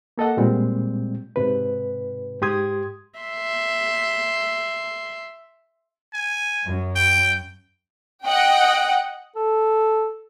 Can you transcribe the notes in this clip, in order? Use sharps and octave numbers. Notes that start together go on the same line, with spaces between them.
A#3 A4 D#5 F#5
A#2 G3 G#3 C4
G#2 C3 B4
G#2 G4 C6 D#6 G#6
E5 C6
G#5
F#2
G5
D#5 F#5 G5
A4